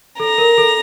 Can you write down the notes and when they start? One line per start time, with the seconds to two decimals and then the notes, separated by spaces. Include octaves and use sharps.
0.20 A4 A#5
0.38 A#4
0.58 A4